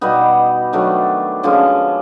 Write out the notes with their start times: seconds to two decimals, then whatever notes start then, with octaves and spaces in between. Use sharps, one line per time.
0.01 B2 G3 B3 D#4
0.73 D#3 F#3 A3 D4
1.43 D3 F3 G#3 C#4